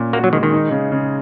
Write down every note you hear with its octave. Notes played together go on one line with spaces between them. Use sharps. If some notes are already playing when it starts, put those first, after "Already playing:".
Already playing: A#2 C#4
A#3 F#4
F#3
D#3 G#3
D#3
D#4
C#3
C#3